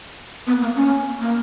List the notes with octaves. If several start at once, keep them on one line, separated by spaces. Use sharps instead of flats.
B3
A#3
C#4
A#3